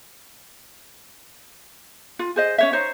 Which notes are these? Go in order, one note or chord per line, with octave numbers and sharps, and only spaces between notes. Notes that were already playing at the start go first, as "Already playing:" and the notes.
F4
G#4 C5 D#5
C#4 C#5 E5
D#4 C5 C#5